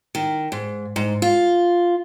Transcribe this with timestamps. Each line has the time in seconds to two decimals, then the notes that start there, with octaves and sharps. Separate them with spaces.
0.15 D#3
0.52 G#2
0.96 G#2
1.22 F4